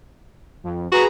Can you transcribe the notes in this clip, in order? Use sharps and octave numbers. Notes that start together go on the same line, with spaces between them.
F2
F#4 G#4 B4 A#5